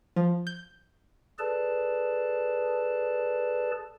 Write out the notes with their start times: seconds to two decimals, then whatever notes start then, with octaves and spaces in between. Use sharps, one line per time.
0.16 F3
0.47 G6
1.39 G#4 A4 B4 D5 A5